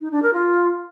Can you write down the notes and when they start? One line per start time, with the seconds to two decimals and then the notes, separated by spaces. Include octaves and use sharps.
0.01 D#4
0.12 D4
0.22 A#4
0.33 F4